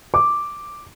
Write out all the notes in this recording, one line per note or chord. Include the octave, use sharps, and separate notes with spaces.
D6